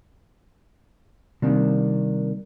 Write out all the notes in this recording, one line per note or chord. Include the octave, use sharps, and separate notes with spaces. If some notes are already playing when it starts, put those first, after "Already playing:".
C3 D#3 G3 A#3 D4